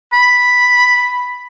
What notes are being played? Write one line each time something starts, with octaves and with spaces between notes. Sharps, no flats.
B5